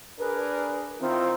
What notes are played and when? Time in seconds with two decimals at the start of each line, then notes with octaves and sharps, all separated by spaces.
0.19 D4 G#4 A#4 B4
1.00 D#3 C4 E4 F4